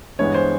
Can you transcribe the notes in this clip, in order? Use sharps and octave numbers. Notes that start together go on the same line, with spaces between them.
G2 E3 G#3 B3 C#5
C5